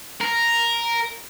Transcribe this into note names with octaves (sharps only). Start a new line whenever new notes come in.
A#4